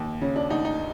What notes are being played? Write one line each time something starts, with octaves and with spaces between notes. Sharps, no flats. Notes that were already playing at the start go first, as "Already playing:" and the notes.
Already playing: D#2
C#3 C#4
D4
D2 D#4
D#4